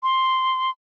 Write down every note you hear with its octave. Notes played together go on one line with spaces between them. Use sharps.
C6